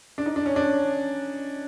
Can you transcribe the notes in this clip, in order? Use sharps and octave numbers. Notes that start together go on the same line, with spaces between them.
D4
D#4
D4
C#4
D4